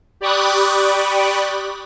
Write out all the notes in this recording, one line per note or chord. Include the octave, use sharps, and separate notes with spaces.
G4 D5 B5 C#6 D#6 F#6